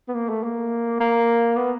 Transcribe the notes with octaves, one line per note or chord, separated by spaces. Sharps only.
B3
A#3
A3
A#3
A#3
B3